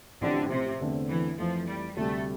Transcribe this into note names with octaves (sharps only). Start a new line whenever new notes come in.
A1 A2 D3 F3 C4 G4
C3
E2 D3 A3 C4
E3
F2 E3 F3 A3
G3
D2 C3 G3 A3